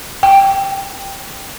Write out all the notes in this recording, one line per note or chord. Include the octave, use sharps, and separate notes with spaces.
G5